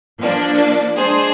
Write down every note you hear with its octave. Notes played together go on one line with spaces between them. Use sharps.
F3 A#3 D4
G#3 D4 G#4 C5